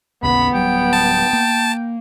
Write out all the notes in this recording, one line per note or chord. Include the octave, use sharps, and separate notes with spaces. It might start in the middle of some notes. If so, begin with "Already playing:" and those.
A1 D#2 C#3 B3 B5
D1 F#3 G3 G5
A5
A#3